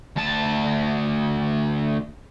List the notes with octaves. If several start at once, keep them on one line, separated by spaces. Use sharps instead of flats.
D2 A5